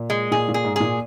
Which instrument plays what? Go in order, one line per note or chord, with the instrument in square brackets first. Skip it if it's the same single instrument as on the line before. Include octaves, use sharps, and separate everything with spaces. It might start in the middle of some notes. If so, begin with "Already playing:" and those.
Already playing: [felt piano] A#2
[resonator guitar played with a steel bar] G#3
[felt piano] A#2 [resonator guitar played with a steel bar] G#4
[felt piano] A#2
[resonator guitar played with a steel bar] G#4
[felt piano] G#2
[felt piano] A#2 [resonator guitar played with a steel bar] G#4